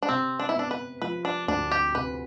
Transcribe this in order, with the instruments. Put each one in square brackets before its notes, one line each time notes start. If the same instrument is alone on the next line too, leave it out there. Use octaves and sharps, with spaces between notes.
[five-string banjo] D4
[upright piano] C3 [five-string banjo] C4
[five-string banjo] D4
E4
[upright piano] B3 [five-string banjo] D4
[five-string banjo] B4
[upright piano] F3 [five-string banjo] B4
[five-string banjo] D4
[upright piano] D2 [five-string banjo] D4
[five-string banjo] G4
[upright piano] C3 [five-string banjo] B4